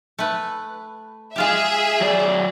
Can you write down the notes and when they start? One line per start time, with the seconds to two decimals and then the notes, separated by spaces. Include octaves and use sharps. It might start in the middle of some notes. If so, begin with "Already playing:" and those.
0.19 A3 B4
1.36 G#3 F4 G4 G#4 E5
2.01 F#3 D5